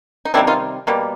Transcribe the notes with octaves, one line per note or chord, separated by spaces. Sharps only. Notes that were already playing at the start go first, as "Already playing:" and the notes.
D#4
C3 D#3 G3 A#3 D4 E4
D#4 F4
B2 G3 A#3